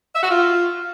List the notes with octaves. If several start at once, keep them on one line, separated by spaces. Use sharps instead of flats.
E5
F#4
F4